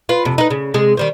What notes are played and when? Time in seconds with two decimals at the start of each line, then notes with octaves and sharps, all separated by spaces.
0.09 F4 B4
0.25 F2 C3
0.38 D#4 B4
0.50 C#3
0.74 C3 G#3 G#4
0.97 D#3 G3 C5